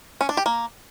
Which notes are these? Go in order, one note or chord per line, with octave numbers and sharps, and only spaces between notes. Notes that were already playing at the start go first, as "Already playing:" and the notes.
C#4
D4
G4
A#3